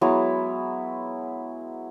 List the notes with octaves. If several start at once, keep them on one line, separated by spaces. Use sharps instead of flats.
F#3 G#3 B3 E4